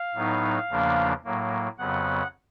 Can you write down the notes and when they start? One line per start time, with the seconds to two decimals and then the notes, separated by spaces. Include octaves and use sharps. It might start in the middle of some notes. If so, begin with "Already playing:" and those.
Already playing: F5
0.15 A2 F#3 B3 D#4
0.70 E2 C#3 F3 A#3 D4
1.24 A2 F#3 A#3
1.78 F2 C#3 F#3 B3 F#5